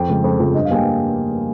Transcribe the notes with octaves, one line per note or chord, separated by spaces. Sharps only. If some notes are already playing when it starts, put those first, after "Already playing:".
Already playing: F2 G5
C#3 F3 G#3
F2
C#3 F3 G#3
G2 D#5
F5
G3 A#3 G5 G#5